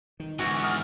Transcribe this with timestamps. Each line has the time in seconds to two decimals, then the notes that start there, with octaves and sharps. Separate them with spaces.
0.20 D#3
0.39 E2 G#2 D3 F#4
0.63 D#6 F6